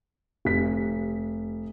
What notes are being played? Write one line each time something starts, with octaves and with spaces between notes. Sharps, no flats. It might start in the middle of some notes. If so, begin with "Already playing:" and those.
F1 B6